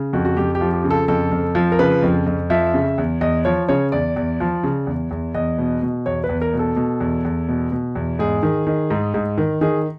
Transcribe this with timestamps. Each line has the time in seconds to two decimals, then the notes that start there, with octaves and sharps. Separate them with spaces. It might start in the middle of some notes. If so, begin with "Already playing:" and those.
Already playing: C#3
0.13 F2 F#4
0.25 F#4
0.37 F2 G4
0.55 G4
0.61 F3
0.73 G4
0.84 C#3
0.90 A4
1.08 F2 A4
1.31 F2
1.55 F3
1.72 A#4
1.79 C#3 B4
2.02 F2
2.26 F2
2.50 F3 E5
2.74 C#3
2.98 E2
3.21 E2 D#5
3.45 F3 C#5
3.68 C#3 C#5
3.92 E2 D5
4.16 E2
4.40 F3
4.64 C#3
4.87 E2
5.11 E2
5.34 E2 D#5
5.58 B2
5.82 B2
6.06 E2 C#5
6.24 B4
6.29 E2
6.41 A#4
6.53 B2
6.59 A4
6.76 B2
7.00 E2
7.25 E2
7.48 B2
7.72 B2
7.95 E2
8.19 G#2 G#4
8.43 D#3
8.67 D#3
8.90 G#2
9.14 G#2
9.38 D#3
9.61 D#3 G#4